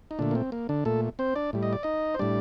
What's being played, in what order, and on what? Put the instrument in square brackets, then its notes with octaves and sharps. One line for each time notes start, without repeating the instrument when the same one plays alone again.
[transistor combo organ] D#4
A#2 D3 A3 D4
A#3
C4
A#3
D3 D4
A#2 A3 A4
C4 C5
D4 D5
A2 G3
D#5
D5
D#4 D#5
C5
A2 G3 D4 D5